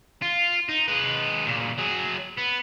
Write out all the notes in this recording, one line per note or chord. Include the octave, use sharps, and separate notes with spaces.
F4
D#4
G#3 B4
A#2 C#3
F#3 G#4
B3